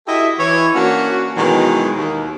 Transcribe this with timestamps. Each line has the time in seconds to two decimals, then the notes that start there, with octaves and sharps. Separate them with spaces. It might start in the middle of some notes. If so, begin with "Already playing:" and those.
0.07 E4 F#4 G4 A4 D#5 E5
0.39 E3 C#5
0.75 A#3 C#4 D4 F#4
1.36 B2 D#3 E3 F#3 G#3
1.97 D#2